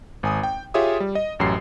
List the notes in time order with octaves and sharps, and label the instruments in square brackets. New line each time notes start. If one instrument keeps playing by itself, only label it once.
[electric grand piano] G#1 G#5 D#6
G5
F4 G4 G#4 C#5 E5 D#6
G3
D#5
A1 F#2 G4 C7